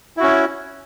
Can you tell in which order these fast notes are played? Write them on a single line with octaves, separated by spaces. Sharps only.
E4 F#4 C#4